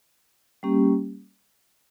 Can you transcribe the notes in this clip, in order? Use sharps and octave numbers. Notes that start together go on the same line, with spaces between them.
G3 A#3 C#4 G4